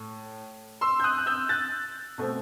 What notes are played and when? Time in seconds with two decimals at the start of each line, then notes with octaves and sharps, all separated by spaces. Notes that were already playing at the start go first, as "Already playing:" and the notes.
Already playing: A2
0.81 C6 E6
1.00 G6
1.04 D#6 F#6
1.18 F#6
1.26 E6 G6
1.49 F#6 A6
2.18 B2 A3 C4